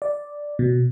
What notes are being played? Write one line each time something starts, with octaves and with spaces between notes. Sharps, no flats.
D5
B2